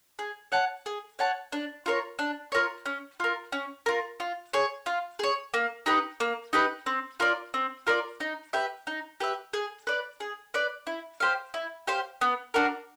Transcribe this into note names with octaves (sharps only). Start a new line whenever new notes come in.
G#4
C#5 F#5 A5
G#4
C#5 F#5 A5
D4
F4 A#4 C#5
D4
F4 A#4 C#5
C#4
F4 A#4
C#4
F4 A#4
F4
G#4 C#5
F4
G#4 C#5
A#3
D#4 G4 B4
A#3
D#4 G4 B4
C4
F4 A#4 D5
C4
F4 A#4 D5
D#4
G4 B4 E5
D#4
G4 B4 E5
G#4
B4 D5
G#4
B4 D5
E4
G4 C5 F5
E4
G4 C5 F5
B3
D4 F#4 A#4